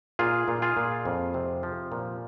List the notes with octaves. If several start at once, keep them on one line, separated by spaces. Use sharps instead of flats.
A#2 F4 G#4
A#2
F4 G#4
A#2
F2
C3
F3
A#2